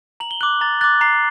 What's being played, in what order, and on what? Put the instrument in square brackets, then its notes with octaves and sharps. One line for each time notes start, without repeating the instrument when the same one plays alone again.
[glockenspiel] A#5 F#7
G7
D6 F#6 F#7
A#5 A6
D6 F#6 A6
A#5 C7